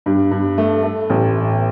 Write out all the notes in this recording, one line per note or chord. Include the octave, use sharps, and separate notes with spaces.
G2
G2
A3
A3
A1